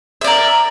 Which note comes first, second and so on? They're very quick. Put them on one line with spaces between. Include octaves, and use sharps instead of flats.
E5 D5 A#4